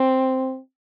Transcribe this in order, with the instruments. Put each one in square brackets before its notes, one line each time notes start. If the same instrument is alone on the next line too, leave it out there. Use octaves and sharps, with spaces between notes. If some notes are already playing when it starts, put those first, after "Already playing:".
Already playing: [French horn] C4